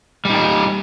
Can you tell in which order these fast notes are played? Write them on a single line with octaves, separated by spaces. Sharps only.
G3 D#4 G4